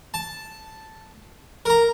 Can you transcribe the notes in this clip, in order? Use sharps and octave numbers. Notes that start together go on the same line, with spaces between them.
A5
A#4 A#5